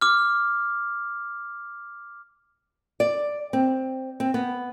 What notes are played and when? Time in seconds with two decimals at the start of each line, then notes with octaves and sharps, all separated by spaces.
0.01 D6 F6
3.00 D5
3.53 C4
4.20 C4
4.34 B3